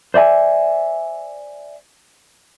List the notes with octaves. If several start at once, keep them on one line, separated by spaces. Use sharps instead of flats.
C5 D5 E5 G#5